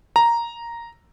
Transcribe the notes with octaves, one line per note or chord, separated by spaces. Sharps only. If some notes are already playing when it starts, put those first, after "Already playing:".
A#5